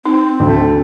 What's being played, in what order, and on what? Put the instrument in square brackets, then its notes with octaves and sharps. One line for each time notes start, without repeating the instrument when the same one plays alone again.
[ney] C4 [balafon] D#4
[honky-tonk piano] D2 [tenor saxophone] A3